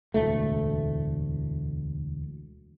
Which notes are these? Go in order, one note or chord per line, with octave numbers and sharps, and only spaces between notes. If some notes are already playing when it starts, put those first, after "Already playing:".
E1 D2 A2 A3